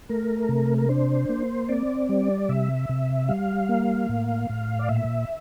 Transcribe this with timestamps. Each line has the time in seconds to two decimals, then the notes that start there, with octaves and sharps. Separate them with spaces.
0.09 A3 A#4
0.49 C3
0.78 A#4
0.89 D4 C5
1.29 A#3
1.69 C4 D5
2.09 G3
2.49 C3 E5
2.89 C3
3.29 G3 F5
3.69 A#3
4.09 A2
4.49 A2
4.79 D5
4.89 A#2 E5